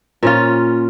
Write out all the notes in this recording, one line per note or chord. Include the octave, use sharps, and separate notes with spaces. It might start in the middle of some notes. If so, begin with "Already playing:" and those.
A#2 C#4 F4